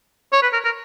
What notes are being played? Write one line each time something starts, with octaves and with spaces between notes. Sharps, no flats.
C#5
B4
A#4
A#4